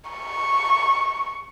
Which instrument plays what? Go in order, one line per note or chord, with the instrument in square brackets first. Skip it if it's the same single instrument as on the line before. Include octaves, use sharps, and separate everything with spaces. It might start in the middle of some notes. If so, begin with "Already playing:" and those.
[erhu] C#6